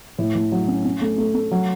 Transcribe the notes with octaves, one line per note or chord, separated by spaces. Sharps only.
A2
A2
F#3
C#4
C#4
A3
A3
A3
F#3